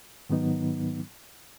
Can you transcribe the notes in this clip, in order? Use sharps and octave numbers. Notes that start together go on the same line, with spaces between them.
G#2 D#3 F#3 B3 D#4